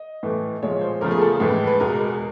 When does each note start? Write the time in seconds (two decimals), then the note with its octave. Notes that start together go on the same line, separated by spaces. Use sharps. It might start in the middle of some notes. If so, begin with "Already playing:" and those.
Already playing: D#5
0.23 A2 E3 A3
0.63 A#2 F3 G#3 C#5
0.81 C5
1.01 E2 C#3 F3 A3 A#4
1.11 G#4
1.21 A4
1.40 A2 E3 G#3
1.67 B4
1.80 E2 B2 G#3 A#4